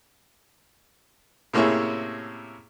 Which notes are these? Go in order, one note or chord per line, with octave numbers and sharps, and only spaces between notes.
A2 C3 A#3 C#4 E4 G#4